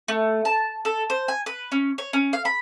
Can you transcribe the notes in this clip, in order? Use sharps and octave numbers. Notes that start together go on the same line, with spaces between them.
A3
A5
A4
C5
G#5
B4
C#4
C#5
C#4
F5
B5